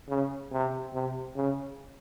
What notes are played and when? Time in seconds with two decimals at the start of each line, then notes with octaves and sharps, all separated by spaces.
0.09 C#3
0.52 C3
0.94 C3
1.36 C#3